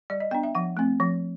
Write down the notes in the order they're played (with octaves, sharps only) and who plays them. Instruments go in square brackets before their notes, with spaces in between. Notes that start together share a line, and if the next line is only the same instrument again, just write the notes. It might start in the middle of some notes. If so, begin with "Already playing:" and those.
[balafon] G3 D5
D#5
B3 D4 G5
E5
F3 F#5
A3 C4
F3